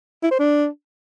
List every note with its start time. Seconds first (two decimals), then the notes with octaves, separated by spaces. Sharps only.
0.23 E4
0.31 C5
0.39 D4